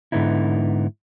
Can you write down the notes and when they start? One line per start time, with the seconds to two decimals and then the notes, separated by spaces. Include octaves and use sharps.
0.12 G#2 D3 B3 D#4 E4